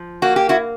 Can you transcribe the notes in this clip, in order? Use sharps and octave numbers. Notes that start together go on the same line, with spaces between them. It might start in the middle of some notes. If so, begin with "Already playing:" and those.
Already playing: F3
A#3 F#4
G4
E4 F#4